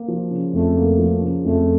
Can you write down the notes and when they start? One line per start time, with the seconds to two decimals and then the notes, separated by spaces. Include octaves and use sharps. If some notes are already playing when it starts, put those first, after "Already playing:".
Already playing: A#3
0.08 F3
0.31 C#3
0.53 F2 A3
0.77 A#3
0.99 F3
1.21 C#3
1.45 F2 A3